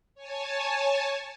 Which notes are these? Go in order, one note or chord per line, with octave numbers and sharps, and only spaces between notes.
C#5 G#5 A5